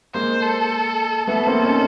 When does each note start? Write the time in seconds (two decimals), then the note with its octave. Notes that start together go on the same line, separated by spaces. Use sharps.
0.14 G#3 A#3 C5
0.42 A4
1.27 A3 B3 A4
1.47 A#3 C4
1.65 C#4 D#4